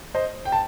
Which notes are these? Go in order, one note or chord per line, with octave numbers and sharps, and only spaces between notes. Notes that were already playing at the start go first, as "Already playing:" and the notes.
C5 D#5
G5
A5